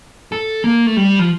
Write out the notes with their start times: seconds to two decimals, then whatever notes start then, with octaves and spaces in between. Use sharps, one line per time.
0.32 A4
0.64 A#3
0.86 A3
0.96 G3
1.19 F3